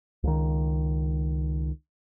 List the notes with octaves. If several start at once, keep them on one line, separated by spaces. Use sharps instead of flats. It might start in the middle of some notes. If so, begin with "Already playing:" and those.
C#2 D#3